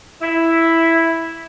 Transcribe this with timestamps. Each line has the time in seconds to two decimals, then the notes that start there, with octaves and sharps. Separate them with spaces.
0.21 E4